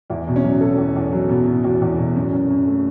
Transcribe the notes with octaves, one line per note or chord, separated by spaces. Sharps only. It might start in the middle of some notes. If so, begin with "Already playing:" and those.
E2 E4
B2
C#4
F#3
F#3 A4
E2
E2
F#3
B2
B2
E2 F#4
E2
B2
F#2
F#2
F#2
A3